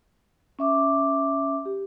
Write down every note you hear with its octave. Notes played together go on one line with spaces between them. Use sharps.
C#4 E5 D6
G4